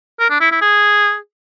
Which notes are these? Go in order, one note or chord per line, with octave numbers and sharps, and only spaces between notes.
A#4
D4
E4
E4
G#4